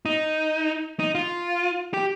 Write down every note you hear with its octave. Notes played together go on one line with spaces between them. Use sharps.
D#4
D#4
F4
G4